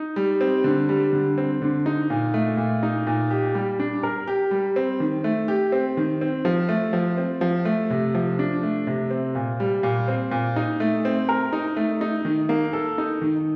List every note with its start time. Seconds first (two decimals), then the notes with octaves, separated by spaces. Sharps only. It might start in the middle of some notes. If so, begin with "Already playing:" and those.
Already playing: D#4
0.16 G3
0.41 C4
0.64 D3
0.89 G3
1.13 D3
1.38 C4
1.62 D3
1.86 D#4
2.10 A#2
2.34 A3
2.57 A#2
2.83 D#4
3.07 A#2
3.30 G4
3.55 G3
3.80 D4
4.03 A#4
4.27 G4
4.51 G3
4.76 C4
5.00 D#3
5.24 A3
5.48 G4
5.72 C4
5.97 D#3
6.21 C4
6.45 F3
6.69 A3
6.93 F3
7.17 C4
7.41 F3
7.65 A3
7.90 C3
8.14 F3
8.39 D4
8.63 A3
8.87 C3
9.10 C4
9.35 A#2
9.60 G3
9.83 A#2
10.08 C4
10.31 A#2
10.56 D#4
10.80 A3
11.05 C4
11.29 A#4
11.53 D#4
11.77 A3
12.01 D#4
12.25 D#3
12.49 A#3
12.73 A4
12.98 D#4
13.22 D#3